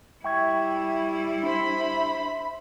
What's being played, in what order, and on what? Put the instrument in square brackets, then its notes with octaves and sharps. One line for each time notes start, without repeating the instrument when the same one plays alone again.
[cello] G3 E4 [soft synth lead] E5 [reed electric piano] G5 C#6 G#6
[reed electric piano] D4 [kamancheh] C5 B5